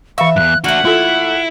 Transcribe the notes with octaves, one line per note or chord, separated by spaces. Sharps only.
E3 E5 F5 C#6
E2 G2 F#6
A3 A#3 D4 F#4 F#5
E4 F4 A4